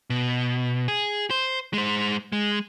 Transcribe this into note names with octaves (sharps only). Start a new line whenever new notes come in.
B2
G#4
C5
G#3 C5
G#3